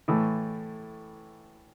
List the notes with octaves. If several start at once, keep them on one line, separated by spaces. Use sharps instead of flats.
A2 E3 A3 E4